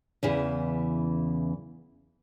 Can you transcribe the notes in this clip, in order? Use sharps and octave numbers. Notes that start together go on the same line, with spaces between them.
E2 C#3 E3